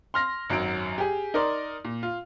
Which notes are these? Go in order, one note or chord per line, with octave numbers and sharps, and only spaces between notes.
C6 F6 A#6
G#1 F#2 F#3 D7
G4 G#4
D#4 A#4 D5 C6
A#2
F4